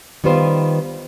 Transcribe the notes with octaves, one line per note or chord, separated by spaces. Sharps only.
D#3 G3 B3 F4 C5